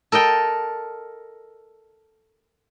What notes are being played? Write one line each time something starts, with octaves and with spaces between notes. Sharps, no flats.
A4 A#4 D#5 G5